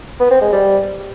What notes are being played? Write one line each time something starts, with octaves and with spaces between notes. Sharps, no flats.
B3
C4
G#3
G3